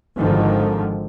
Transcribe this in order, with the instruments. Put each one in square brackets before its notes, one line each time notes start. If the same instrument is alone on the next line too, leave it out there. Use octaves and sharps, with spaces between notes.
[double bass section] G#1 G#2 D3 D#3 F3